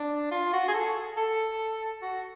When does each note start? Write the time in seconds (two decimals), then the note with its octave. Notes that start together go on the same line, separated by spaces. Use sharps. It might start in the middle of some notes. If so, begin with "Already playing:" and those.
Already playing: D4
0.31 F4
0.53 F#4
0.68 G#4
0.74 A4
1.17 A4
2.02 F#4